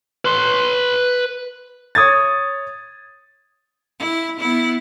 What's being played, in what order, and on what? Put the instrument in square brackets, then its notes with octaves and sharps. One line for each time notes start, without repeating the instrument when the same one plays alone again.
[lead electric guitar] B4 C6
[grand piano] C#5 D#6 G#6 A6
[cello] E4
B3 E4